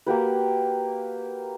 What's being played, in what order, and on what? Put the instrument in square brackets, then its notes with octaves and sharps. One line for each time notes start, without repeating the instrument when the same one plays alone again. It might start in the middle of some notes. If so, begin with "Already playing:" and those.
[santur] A#3 F#4 G4 B4